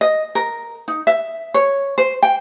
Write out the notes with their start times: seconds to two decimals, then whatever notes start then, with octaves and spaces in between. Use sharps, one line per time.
0.01 D#5
0.35 A#4
0.88 D#4
1.07 E5
1.54 C#5
1.98 C5
2.23 G5